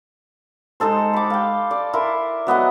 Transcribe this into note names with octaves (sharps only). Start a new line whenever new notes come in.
G#3 D#4 A4 C5
B5 D6
F5 G5
D5
E4 A#4 C6
F#3 B3 D#5 F#5